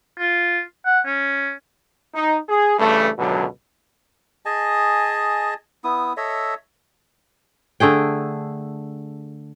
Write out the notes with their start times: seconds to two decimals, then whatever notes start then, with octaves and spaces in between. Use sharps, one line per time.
0.19 F4
0.86 F#5
1.06 C#4
2.15 D#4
2.49 G#4
2.79 G2 C#3 E3 A3
3.18 C#2 F#2 B2 D3 F#3
4.46 G#4 D#5 G#5 A5
5.84 B3 E4 D#6
6.17 A4 C#5 D#5 E5
7.80 D3 A3 G#4 G5